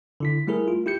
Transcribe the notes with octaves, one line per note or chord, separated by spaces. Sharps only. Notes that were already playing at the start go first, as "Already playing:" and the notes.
D3 E4 B6
G3 A3 E4 G#4 A#4
F4
E4 G4 G6 C#7